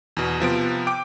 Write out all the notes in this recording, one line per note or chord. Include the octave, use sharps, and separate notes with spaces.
E2 B2
C3 F3 B3 D7
G5 D6 D7